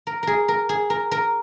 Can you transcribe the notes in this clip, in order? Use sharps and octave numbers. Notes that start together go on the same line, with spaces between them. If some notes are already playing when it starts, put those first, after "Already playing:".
A#4
G#4 A#4
A#4
G#4
A#4
A#4